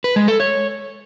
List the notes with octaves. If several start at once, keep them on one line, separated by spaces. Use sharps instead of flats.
B4
G#3
A4
C#5